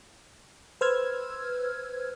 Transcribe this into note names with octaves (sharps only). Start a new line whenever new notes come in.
B4 C5 E6 F6 G#6